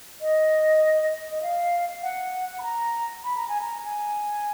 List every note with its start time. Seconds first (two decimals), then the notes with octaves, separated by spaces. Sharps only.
0.21 D#5
1.31 D#5
1.42 F5
2.03 F#5
2.59 B5
2.63 A#5
3.24 B5
3.37 A#5
3.49 G#5
3.62 A#5
3.85 G#5